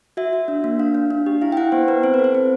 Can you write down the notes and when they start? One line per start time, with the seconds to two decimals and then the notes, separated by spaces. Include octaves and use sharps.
0.17 F#4 E5
0.33 F#4
0.48 D4
0.64 A#3
0.79 D4 F5
0.95 D4
1.11 D4
1.26 G4
1.41 E4 F5
1.52 G5
1.57 E4 F#5
1.72 B3 C5
1.88 B3 B4
2.03 C4 C5
2.14 B4
2.19 A4 C5
2.35 C4